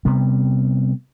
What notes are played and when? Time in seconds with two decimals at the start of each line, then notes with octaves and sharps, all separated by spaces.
0.05 C3 G3 B3